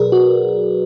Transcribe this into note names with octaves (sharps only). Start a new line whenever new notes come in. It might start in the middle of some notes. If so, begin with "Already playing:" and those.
Already playing: B2 F#3 G#4 A#4 B4 D5
F#4